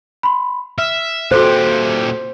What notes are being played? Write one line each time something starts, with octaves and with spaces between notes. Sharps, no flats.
B5 C6
E5 F6
A#2 F#4 G4 A4 C5 F#6